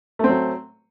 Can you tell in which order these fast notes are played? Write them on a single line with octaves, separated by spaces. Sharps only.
A3 C4 F#3